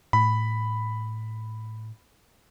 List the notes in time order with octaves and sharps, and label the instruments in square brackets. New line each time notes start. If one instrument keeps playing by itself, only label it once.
[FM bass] A2 [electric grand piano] B5